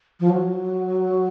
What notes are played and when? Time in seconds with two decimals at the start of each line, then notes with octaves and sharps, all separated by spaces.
0.20 F3
0.30 F#3